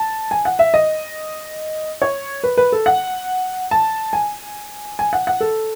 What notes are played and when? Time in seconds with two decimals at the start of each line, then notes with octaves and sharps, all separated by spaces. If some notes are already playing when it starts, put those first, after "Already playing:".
Already playing: A5
0.31 G#5
0.45 F#5
0.59 E5
0.74 D#5
2.02 C#5
2.43 B4
2.57 B4
2.72 A4
2.86 F#5
3.71 A5
4.13 G#5
4.99 G#5
5.13 F#5
5.27 F#5
5.40 A4